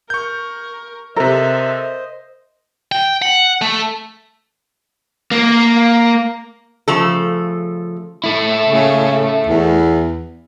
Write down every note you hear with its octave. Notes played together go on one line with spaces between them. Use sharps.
A#4 C#6 G6
C3 A4 A#4 C5 D#5 E5
G5
F#5
A3
A#3
C#3 F3 A3 A4
A3 E4
C#3
E2